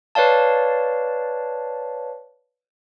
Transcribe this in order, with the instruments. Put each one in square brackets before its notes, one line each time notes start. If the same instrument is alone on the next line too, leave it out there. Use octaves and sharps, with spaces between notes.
[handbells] B4 C#5 D5 F5 A5